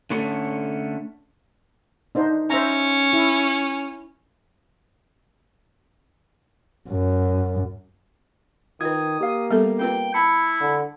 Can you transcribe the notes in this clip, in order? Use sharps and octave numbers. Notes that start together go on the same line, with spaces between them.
D3 A3 C#4
D4 D#4 C5
C#4 C5 E5 A#5
E4
F#2
D#3 F4 B4 D#6 G#6
A#3 G4 F5
G3 B3 A4
C4 F4 B4 G5
E4 A5 B5 C#7
D3